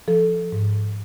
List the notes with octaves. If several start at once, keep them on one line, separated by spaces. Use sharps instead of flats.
F3 A4
G#2